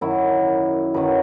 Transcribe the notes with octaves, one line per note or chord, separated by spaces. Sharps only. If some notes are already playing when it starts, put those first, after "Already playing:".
F#2 D#3 F#3 E4
F#2 D#3 F#3 B4